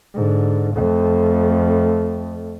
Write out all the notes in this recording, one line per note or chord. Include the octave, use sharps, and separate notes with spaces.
G#2 D3
F2 A3